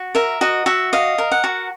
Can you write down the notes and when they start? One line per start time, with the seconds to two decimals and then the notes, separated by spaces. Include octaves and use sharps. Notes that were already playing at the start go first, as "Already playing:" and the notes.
Already playing: F#4
0.15 A#4 E5
0.41 F#4 D#5
0.66 F#4 E5
0.93 D#5 F5
1.18 A#4
1.32 F#5
1.44 F#4